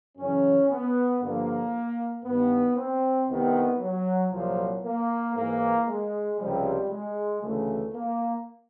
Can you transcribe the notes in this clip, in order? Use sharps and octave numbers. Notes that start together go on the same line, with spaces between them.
F#2 C#3 E3 C#4
B3
G2 D3 F3 A#3
G2 D#3 B3
C4
C2 C3 D#3 B3
F#3
C2 A#2 F3 F#3
A#3
G#2 E3 A#3
G#3
C#2 C3 F3 G3
G#3
D2 C#3 E3 A3
A#3